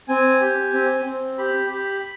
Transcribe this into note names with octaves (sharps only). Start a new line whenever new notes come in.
C4 G#5
G4
C4
C4
G4 B5
G4